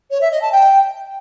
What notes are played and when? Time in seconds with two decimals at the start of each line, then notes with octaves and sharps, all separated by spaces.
0.10 C#5
0.21 E5
0.31 D#5
0.41 A5
0.52 G5